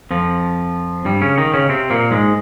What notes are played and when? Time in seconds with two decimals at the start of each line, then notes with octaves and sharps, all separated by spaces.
0.11 F2 F3
1.05 G2 G3
1.21 C#3 C#4
1.38 D#3 D#4
1.54 C#3 C#4
1.69 C3 C4
1.90 A#2 A#3
2.11 G#2 G#3